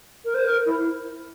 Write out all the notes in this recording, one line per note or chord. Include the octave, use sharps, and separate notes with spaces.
A#4
C5
A#4
E4